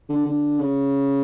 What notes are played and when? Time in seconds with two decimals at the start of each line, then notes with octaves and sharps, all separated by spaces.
0.09 D3
0.26 D3
0.60 C#3